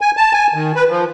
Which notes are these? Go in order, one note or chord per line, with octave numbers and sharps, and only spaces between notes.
G#5
A5
G#5
D#3
B4
F3